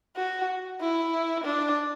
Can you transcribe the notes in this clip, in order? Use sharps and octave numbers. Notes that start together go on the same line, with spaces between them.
F#4
E4
D4